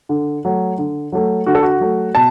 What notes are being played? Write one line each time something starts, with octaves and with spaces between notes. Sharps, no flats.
D3
F#3 A3
D3
F#3 A3
D3 F#4
A4
F#4
F#3 A3
B2 A5